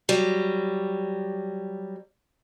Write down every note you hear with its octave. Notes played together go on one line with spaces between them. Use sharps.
F#3 G3